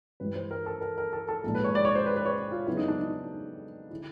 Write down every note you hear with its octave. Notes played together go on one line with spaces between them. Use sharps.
G2 E3 G3 B4
C5
A#4
A4
A#4
A#4
A4
A4
A#1 G#2 F3
B4
C#5
D5
C#5
C5
B4
B4
C#5
F4
F2 C#3 F#3 B3 E4
D#4
D4
D#4
D3 E4